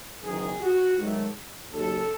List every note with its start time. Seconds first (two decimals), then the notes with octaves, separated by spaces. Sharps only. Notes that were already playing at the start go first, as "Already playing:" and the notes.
0.23 F#1 E2 D#3 G#4
0.61 F#4
0.98 G#2 D#3 F#3 A3
1.72 D#2 C#3 F#3 A4